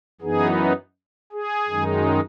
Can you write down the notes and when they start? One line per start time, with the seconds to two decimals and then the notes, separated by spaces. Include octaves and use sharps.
0.21 F#2 E3 B3 D#4 G#4
1.32 G#4
1.68 F#2 D#3 G#3 D#4